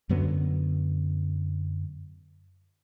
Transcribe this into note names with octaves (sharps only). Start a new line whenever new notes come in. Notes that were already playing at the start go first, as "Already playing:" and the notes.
F#2 D3 F#3 B3